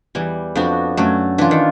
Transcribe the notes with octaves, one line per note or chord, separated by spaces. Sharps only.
E2 E3 G3
F2 F3 B3 D4 F#4
F#2 F#3 A3
E3 D4 F4
D#3